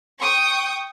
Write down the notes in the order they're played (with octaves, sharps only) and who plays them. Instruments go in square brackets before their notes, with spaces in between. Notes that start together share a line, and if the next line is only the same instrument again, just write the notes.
[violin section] G5 C#6 D#6